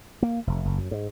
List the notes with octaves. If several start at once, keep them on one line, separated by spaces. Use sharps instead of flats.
A#3
F1
F#1
F#2
G#2